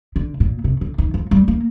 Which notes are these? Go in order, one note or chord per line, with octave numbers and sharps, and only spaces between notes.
D3
A#2
C3
D3
D#3
F3
G3
A#3